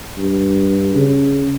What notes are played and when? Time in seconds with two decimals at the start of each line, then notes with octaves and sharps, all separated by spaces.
0.18 G2
0.95 C#3